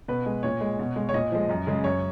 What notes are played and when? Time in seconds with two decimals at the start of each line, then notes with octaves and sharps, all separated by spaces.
0.08 B2 B4
0.26 G#3
0.43 A#2 C#5
0.61 G#3
0.79 B2
0.96 G#3
1.09 C#5
1.14 A#2 D#5
1.32 F3 G#3
1.49 F#2
1.67 C#3 G#3
1.84 F#2 C#5